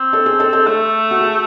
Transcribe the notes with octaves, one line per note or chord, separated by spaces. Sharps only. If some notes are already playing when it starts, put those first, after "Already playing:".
Already playing: C4
A4
G#4
A4
A4
A3 A4
F#4
G#4